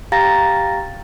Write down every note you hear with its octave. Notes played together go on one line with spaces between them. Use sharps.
G4 F5 G5 A#5 A6 A#6